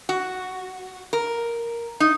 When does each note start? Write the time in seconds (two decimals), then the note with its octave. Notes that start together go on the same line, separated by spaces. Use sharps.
0.09 F#4
1.13 A#4
2.00 D#4